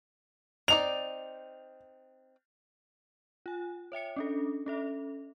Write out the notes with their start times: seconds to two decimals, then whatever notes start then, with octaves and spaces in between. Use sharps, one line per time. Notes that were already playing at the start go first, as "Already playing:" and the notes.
0.68 C4 D#4 D5 F7
3.46 F4 G#5
3.92 C#5 E5 G5 C#7
4.16 C#4 D4 A4
4.66 C#4 A4 E5